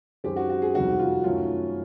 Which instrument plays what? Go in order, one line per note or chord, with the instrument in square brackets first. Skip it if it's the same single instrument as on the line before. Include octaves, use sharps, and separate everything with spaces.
[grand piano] F#2 D#3 G#3 C4 G4
F#4
F#4
G#4
F2 C3 D#3 G3 C4 F#4
F4
F#2 D#3 F#3 A3 C#4 F4